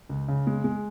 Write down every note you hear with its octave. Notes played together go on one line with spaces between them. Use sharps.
C#2
C#3
G#3
G#3